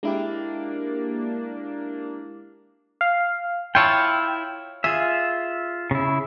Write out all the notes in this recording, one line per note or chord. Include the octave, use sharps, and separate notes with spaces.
G#3 A#3 D4 E4 G4
F5
E4 F4 C#5 G5 A5
F4 G#4 E5
C#3 E4